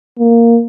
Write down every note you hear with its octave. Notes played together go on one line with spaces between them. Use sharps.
A#3